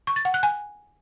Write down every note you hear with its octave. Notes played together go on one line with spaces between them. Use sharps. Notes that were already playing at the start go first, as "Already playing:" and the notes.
C#6
A6
F#5
F#6
G#5